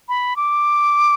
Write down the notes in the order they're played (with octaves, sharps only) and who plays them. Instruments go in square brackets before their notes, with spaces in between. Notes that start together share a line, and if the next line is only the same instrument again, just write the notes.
[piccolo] B5
D6